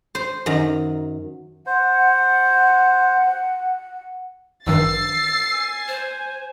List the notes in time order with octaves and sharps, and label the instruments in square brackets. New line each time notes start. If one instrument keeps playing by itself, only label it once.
[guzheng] C5
F#2 D#3 A#5
[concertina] C5 [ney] F#5
[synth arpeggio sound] A1 G2 D#3 [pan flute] E6 [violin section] A6 C7
[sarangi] G#5
[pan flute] C5